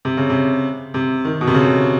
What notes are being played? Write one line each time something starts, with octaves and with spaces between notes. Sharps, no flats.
C3
C#3
C3
C3
D#3
B2
C3
C#3